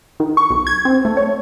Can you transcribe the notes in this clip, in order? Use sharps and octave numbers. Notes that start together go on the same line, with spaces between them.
D#3
C#6
B1
G#6
C4
A3
C#5